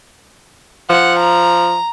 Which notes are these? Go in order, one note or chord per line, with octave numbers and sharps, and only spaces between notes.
F3 F#5
A#5